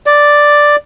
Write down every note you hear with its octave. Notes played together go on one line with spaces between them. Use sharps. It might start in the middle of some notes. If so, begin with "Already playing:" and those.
D5